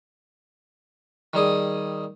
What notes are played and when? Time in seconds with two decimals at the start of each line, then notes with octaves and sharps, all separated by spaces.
1.33 D#3 G3 G#4 D#6